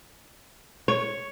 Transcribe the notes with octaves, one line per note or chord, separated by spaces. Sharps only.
C#5